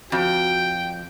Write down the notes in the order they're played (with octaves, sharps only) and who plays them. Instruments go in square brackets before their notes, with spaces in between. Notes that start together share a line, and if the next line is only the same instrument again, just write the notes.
[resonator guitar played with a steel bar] F2 [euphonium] F#4 [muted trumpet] G5